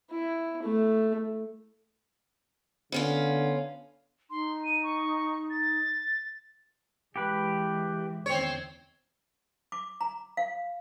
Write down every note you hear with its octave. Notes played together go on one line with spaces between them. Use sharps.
E4
A3
D3 B3 C#4 F4
D#4 C6
D#7
C#6
A6
E3 G#3 G4 B4
E2 D#3 C4 C#5
D6
A#5
F5